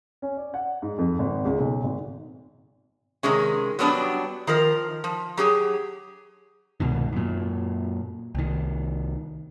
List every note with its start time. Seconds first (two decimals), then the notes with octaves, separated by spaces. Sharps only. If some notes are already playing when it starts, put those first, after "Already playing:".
0.22 C#4
0.37 D5
0.54 F#5
0.82 G#2
0.98 F2
1.19 G#1
1.45 C#2
1.58 B1
1.83 G#1
3.23 C3 D#3 G#3 C#4
3.79 F#3 G3 B3 D4
4.47 D#3 F3 A#4
5.04 F3
5.37 F#3 G4 G#4
6.80 C2 G#2 B2 D#3
7.12 F#2 A#2
8.35 C2 D#3